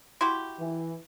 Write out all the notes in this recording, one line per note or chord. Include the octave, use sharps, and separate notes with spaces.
E4 F#4 G4 C6
E3